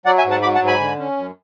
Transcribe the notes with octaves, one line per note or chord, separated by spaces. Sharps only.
F#3 D5 F#5
E5 G#5
G#2
F#5 A5
F#3 B5 D6
F#5 A5
G#2
G#5 B5
D3
C#4
F#2